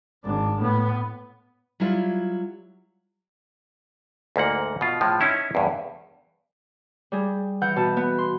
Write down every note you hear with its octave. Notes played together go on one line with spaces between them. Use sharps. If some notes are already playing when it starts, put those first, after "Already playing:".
G#1 D4
A2 B3
F#3 G3 E4 F4
D2 G#2 A#3 F#5
B2 F4
A2 F3 G#3
C#4 D#4 E4 C#5
E2 G2
G3 G#4
E3 F#5 G6
B2 A5
B3
C6